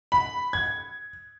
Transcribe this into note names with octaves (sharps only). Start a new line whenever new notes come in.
B5
G#6